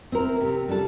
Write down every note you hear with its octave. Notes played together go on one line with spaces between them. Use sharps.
C4 E4 A#4
C3
G3 D4 A4